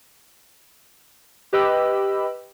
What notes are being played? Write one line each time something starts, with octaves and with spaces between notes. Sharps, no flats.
G4 B4 D#5 G5 B5 E6